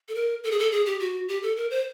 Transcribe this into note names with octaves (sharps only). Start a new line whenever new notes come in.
A4
A#4
A4
G#4
A4
G#4
G4
F#4
G4
A4
A#4
C5